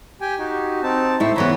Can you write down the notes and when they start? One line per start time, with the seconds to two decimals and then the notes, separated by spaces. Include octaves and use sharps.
0.21 G4 G5 G#5
0.39 D#4 F#4 G4
0.83 C4 D#4 A5
1.20 A2 E4 C5 C#6
1.36 C#3 E3 B3 C#5 A#5 B5